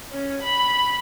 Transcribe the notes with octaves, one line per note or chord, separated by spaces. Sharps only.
C#4
B5